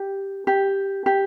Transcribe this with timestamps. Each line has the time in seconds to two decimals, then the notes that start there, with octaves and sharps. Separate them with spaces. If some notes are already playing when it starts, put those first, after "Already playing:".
Already playing: G4
0.47 G4
1.06 G4